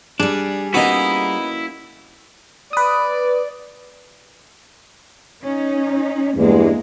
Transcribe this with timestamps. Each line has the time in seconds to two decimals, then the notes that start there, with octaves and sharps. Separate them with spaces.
0.20 G3 D4 G#4
0.74 A#3 B3 C#4 D#4 E4 F#4
2.73 B4 D5 D#6
5.43 C#4 D#4
6.36 E2 G2 G#3 A#3